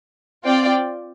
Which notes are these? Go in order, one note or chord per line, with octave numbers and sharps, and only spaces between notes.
C4 F4 D5 G5